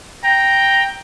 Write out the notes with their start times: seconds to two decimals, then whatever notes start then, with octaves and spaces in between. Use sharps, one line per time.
0.24 G5 A#5